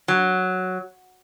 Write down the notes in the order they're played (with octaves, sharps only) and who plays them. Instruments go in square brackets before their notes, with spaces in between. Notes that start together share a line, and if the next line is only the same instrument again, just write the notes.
[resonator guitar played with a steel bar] F#3